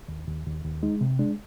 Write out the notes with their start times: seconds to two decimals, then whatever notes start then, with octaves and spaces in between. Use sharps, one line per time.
0.08 D#2
0.27 D#2
0.46 D#2
0.65 D#2
0.83 G#3 D#4
1.01 C3
1.19 G#3 D4